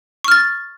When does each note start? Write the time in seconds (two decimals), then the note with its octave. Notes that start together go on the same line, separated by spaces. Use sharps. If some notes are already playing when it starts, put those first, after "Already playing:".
0.24 C#6
0.28 F6
0.32 A6